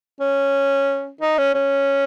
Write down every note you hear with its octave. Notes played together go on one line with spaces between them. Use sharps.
C#4
D#4
C#4
C#4